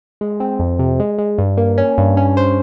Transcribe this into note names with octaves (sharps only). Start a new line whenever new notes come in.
G#3
C4
F2
C3
G#3
G#3
G2
A#3
C#4
G2
C#4
C5